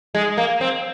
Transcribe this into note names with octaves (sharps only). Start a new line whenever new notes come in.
G#3
A#3
C4